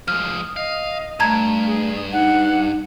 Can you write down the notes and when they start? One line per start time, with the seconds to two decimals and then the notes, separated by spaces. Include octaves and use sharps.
0.08 F3 G#3 D#6 F6
0.57 D#5 F5
1.20 G2 A3 A5 A#5 G#6
1.66 G#4
2.12 D#4 F#5